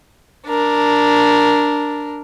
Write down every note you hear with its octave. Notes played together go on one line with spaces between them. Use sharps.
D4 A#4